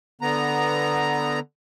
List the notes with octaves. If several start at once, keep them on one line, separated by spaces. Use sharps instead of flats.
D3 B3 A#5